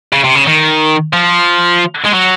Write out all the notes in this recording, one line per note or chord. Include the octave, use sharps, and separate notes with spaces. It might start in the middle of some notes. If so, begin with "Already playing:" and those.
C#3
C3
C#3
D#3
F3
G#3
F#3